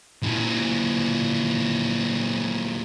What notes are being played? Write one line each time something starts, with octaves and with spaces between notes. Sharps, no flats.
A#2 E3